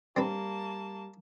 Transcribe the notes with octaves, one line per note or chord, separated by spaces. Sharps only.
G3 A#3 C4 D4 B4 A5